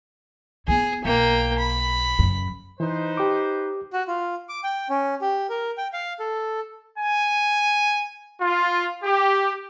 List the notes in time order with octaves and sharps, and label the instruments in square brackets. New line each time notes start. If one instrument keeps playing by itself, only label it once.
[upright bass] B3 E4 [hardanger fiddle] G#4
[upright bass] B1 [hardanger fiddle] A#3 G5
[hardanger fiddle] B5
[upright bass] F#2 C#3
[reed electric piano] E3 [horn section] D#4 B4 C5
[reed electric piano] G4 D6
[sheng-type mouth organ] F#4
F4
D6
G5
C#4
G4
A#4
G5
F5
A4
[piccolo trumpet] G#5
[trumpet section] F4
G4